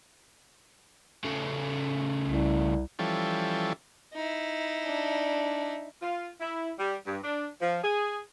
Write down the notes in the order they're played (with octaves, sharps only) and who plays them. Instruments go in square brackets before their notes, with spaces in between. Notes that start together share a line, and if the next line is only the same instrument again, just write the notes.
[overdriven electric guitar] C#3 A3
[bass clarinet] C2
[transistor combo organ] E3 F3 G3 C#4 A4
[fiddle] D#4 E4
[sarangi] D4
[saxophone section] F4
E4
G3
G2
D4
F3
G#4